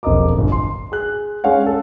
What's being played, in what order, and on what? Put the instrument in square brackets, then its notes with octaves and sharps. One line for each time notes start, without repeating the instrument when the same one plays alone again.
[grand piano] E1 F2 A#4 D#5 A#5 D6
G1
C6
G#4 F#6
G#3 C#4 C#5 F5 F#5
A4